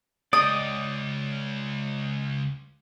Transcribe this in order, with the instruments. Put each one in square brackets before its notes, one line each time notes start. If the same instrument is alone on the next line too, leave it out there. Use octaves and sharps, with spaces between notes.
[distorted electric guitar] C#2 [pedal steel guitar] D5 D#5 [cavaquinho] D#6